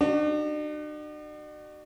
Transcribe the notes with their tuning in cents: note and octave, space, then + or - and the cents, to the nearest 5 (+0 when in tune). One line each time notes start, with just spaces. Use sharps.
D4 +45 F#4 +30